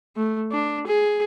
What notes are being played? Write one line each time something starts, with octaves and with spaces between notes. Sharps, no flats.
A3
D4
G#4